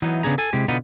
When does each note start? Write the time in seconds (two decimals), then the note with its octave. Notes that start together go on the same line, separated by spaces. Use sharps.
0.02 E3 F#3 B3 D#4 E4
0.23 C#3 B3 D4 G#4 A#5
0.38 A4 G#5
0.53 C3 G#3 E4 G4
0.68 B2 D3 B3 D#4 F4 A#5